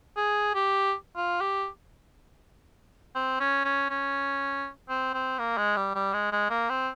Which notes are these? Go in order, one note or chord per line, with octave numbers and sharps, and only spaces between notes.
G#4
G4
F4
G4
C4
C#4
C#4
C#4
C4
C4
A#3
G#3
G3
G3
G#3
G#3
A#3
C4